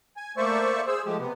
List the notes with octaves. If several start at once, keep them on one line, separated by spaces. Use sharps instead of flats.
G#5
A3 A#3 C5 D5 E5 C#6
G#4 C5 E6
F3 G#3 A3 G4
C3 B3